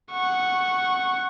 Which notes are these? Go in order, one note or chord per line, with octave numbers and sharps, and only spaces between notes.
F#5 C#6